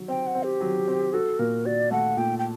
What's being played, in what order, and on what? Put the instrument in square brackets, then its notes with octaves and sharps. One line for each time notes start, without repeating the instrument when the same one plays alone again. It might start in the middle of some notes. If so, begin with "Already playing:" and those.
Already playing: [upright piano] F#3
[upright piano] C4 [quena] G5
[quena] F#5
[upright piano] C4
[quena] G4
[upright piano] F#3
C4
[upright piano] F#4 [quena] A4
[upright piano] A#2 [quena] A#4
[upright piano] F#4 [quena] D5
[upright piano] A3 [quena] F#5
[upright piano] A#2 [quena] G5
[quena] G5